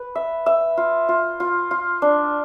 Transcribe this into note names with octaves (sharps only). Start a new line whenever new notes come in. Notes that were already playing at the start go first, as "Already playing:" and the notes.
Already playing: B4
E5
E5
F4
F4
F4
F4
D4